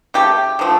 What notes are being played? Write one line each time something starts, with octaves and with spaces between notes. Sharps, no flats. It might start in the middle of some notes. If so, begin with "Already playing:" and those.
C#3 F#3 A3 G4
D3 F3 A3